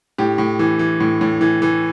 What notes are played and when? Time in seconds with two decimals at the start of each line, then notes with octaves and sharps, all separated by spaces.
0.18 A2 G4
0.38 A2
0.59 E3
0.79 E3
1.00 A2
1.21 A2
1.41 E3
1.62 E3